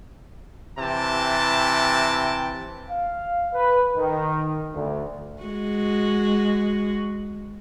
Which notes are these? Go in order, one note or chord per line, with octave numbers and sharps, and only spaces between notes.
C3 E3 G5 A5
F5
B4
D#3
D2
G#3 F#4